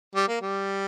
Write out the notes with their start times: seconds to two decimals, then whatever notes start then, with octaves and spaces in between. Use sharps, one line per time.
0.15 G3
0.28 A#3
0.41 G3